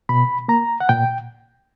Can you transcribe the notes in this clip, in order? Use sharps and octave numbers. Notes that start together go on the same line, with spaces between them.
B2 B5
A#3 A#5
F#5
A#2 G5